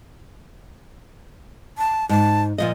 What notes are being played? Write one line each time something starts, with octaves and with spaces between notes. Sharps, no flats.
A5
G#2 A5
A#2 F3 F4 D#5